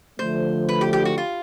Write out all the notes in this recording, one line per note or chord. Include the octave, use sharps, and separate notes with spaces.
D3 F3 A3 C5
B4
G4
G4
F#4
F4